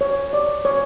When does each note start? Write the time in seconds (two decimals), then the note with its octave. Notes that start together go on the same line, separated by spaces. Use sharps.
0.01 C#5
0.33 D5
0.65 C#5